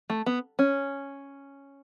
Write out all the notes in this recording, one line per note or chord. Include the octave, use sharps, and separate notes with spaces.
A3
B3
C#4